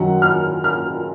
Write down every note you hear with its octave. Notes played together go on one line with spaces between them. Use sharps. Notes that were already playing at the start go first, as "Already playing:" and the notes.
Already playing: F#2 D#3 F#3 F#5
F6
F6